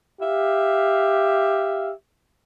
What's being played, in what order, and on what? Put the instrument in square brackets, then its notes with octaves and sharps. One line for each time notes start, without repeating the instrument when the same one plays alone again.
[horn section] G4 E5 F5